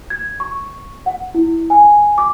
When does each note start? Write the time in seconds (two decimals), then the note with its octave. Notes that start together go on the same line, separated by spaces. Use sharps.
0.10 G#6
0.40 C#6
1.06 F#5
1.34 E4
1.70 G#5
2.18 D6